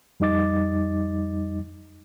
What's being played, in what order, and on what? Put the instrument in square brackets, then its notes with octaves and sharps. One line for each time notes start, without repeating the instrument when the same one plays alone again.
[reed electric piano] F2 G3 D#4 D#5 D6 A6